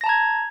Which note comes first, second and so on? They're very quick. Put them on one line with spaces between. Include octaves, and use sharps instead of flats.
A#6 A5 A#5 G#6